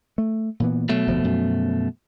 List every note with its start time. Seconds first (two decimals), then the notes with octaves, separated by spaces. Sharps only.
0.18 A3
0.60 A#2 E3 B3
0.89 B2 F#3 A3
1.07 F1 D2 F3
1.23 F#2 F3